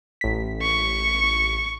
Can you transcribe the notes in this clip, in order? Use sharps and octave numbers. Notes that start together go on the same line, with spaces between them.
A1 B6
C#6